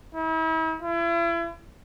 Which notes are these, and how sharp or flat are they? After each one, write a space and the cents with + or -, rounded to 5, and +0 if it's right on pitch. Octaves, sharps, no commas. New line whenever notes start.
E4 -40
E4 +40